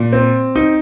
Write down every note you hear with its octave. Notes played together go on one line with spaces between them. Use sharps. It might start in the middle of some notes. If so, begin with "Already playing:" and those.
Already playing: A#2
C4
D#4